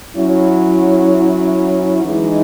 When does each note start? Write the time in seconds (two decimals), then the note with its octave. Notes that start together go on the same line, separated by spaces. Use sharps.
0.16 F#3 C#4 E4
2.05 E3 G#3 D#4